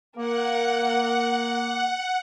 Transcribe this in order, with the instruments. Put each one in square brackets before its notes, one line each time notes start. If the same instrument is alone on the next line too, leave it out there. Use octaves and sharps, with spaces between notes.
[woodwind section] A#3 [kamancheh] A#4 [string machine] F#5